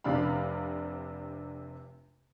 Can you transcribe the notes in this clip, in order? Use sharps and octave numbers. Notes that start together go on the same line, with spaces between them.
F1 C3 D4 F5 B5